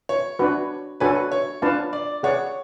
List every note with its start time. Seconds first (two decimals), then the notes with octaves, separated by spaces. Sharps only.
0.09 C#5
0.39 D4 F#4 B4
1.00 D4 F#4 A4 B4 C#5 G#5
1.32 C#5
1.62 D4 F4 B4 F5 A5
1.93 D5
2.23 G#4 C#5 D5 F#5